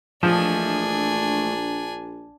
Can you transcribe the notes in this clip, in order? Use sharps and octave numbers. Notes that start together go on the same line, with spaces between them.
A#1 E3 F3 A3 D4 D#5 G#5